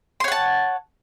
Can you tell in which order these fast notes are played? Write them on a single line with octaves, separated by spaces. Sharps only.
C6 C#5 F#5 A5